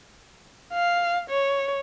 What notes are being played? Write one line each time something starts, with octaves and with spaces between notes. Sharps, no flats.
F5
C#5